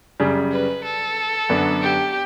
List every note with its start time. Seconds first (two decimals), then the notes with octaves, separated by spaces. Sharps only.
0.20 F#2 C#3 G3
0.52 B4
0.84 A4
1.49 F#2 D3 F#3 B3 D4
1.82 G4